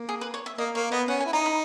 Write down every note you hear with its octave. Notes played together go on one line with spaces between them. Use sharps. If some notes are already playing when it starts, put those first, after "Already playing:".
Already playing: A#3
G#4
B4
C#5
E5
A#3 D#5
A#3 C#5
B3 D#5
C#4 F#5
G#5
E4
D#4 A#5
B5